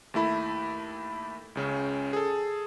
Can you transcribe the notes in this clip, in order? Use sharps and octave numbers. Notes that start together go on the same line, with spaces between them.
D#2 A3 E4 B5
C#2 C#3 C#4
G#4 A4